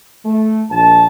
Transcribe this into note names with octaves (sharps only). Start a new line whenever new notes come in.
A3
A#1 A5